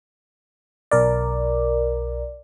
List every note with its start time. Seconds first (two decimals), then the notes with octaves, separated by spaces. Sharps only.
0.91 B1 A#4 D5